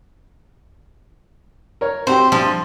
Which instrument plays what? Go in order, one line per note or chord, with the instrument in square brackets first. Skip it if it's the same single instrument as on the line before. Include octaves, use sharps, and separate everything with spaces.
[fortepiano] A#4 C#5
[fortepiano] C4 F#4 G4 [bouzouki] C5
[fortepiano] G2 [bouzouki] F3